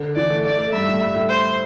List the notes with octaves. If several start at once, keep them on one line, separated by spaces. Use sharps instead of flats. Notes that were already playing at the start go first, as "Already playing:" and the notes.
Already playing: D3
E3 D5
A3
A3 D5
A3
G2 E5
A2
G2
A2
C5